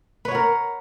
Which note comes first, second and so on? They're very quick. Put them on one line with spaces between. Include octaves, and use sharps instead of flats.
B4 C#5 F#5 A#4